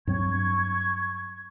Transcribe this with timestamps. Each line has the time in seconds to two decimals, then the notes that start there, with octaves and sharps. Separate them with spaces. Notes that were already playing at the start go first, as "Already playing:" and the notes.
0.07 G2 F#3 C4 C#6 G#6